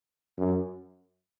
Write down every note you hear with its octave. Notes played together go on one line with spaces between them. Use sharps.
F#2